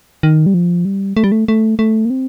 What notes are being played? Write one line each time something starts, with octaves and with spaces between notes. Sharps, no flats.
D#3
G3
F3
G3
A3
G3
A3
A3
A3
A#3
C4